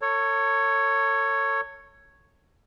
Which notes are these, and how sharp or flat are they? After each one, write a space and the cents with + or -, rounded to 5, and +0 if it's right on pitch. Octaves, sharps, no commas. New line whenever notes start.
A4 +35 C#5 +0